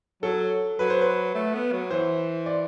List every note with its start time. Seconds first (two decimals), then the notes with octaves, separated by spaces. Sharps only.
0.23 F#3 A4
0.79 F#3 B4
0.90 C5
1.01 B4
1.34 A3
1.54 B3
1.72 F#3
1.90 E3 C5
2.46 D5